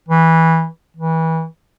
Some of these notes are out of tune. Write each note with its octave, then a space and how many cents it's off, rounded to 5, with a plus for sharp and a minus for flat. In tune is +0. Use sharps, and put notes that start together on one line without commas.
E3 -15
E3 -25